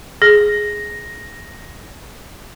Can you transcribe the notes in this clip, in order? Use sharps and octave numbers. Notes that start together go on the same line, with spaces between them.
G#4 A#6